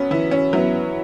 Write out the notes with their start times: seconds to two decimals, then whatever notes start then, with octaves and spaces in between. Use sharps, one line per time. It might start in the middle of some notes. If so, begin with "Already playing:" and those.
Already playing: F#3 B3 C#4
0.11 E3 E4
0.31 C#4
0.53 F#3 E4
0.56 B3